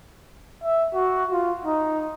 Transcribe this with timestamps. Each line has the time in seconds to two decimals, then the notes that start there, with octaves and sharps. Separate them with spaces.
0.64 E5
0.94 F#4
1.32 F4
1.66 D#4